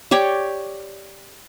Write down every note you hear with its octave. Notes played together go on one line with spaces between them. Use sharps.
G4 C#5 D5 G5